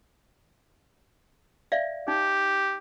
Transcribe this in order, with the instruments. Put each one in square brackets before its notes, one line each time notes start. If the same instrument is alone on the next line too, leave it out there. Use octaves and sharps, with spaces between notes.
[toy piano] D5 E5 F5
[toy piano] D#4 [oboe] G4